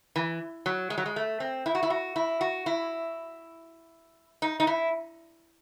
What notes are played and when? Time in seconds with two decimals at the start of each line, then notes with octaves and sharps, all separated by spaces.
0.16 E3
0.66 F#3
0.90 G#3
0.98 F#3
1.06 G#3
1.16 A3
1.40 C4
1.66 E4
1.75 F#4
1.83 E4
1.90 F#4
2.16 E4
2.41 F#4
2.66 E4
4.42 D#4
4.60 D#4
4.67 E4